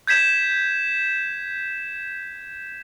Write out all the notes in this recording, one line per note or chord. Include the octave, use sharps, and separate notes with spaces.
G6 G#6 B6 E7